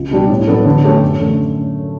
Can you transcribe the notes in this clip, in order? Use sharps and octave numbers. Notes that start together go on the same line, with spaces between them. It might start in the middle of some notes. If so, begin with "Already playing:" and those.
Already playing: C#2
B2 G3 D4
A2
F#3 B3 D4 A4
D3
A3 C#4 G4 C#5
F#2
D3 A3